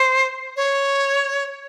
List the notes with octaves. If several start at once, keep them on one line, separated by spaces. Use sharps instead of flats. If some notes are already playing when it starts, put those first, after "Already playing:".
Already playing: C5
C#5